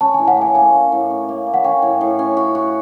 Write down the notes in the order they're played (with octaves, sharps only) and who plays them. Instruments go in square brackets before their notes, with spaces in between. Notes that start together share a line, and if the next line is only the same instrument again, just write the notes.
[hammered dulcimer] C#4 [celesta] A5
[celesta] G#5
[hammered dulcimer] A2
[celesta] F#5
[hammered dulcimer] A#3 [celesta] G#5
[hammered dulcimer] A#3 [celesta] G#5
[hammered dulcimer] C#4
A2
C#4
A#3
A#3
[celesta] F#5
[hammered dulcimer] C#4 [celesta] G5
[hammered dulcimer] A2
A2
C#4
F#4
F#4